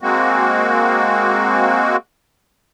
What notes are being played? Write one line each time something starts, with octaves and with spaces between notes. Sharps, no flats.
G#3 A#3 C4 F#4